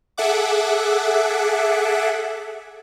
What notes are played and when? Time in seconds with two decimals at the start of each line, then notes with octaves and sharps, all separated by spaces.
0.18 G#4 A4 E5 F#5 D6